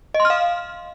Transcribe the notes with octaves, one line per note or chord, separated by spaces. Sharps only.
D#5
C6
F6
F5